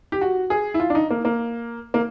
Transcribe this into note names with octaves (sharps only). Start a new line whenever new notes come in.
G4
F#4
G#4
E4
F4
D4
D#4
A#3
A#3
A#3